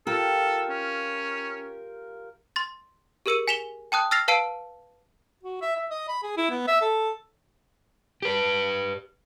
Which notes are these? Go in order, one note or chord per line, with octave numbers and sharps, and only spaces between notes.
F4 G4 A4 A#4
C#4
C6 A6
G4 G#4 A#4 E6 C#7 D#7
G#5 B6 E7 F7 G7
G5 A5 D#6 F#6
E6 F6 A6 A#6 C7 F7
B4 F5 A5 E6 C7 D7
F#4
E5
E5
D#5
B5
G#4
E4
B3
E5
A4
G4 B4